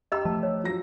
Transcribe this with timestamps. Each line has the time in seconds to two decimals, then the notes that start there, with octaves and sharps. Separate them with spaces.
0.12 G4 D#5 G5 A#5 E6
0.25 F3 A3 A5
0.43 C#5
0.64 F3 F#3 A#6